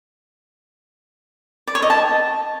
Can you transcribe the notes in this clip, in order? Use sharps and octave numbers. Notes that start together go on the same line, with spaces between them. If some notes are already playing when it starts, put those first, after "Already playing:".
D5
C#5
D#5
A5